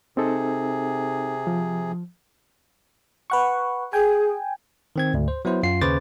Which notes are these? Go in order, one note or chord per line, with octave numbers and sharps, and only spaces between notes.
C3 C4 D#4 G#4 A4
F3
B4 F#5 C#6
G#4 G5 G#5
D#3 C4 G#6
D2 G#2
C5
F#3 B3 E4 C5
F#2 F4 C7
D#2 C#3 B4 C5 D6 A6